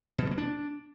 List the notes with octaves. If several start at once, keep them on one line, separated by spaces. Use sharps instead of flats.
B2
F#3
A#3
D4